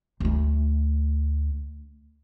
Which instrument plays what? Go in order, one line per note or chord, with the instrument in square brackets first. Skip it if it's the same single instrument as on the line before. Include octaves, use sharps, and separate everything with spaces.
[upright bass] D2 A3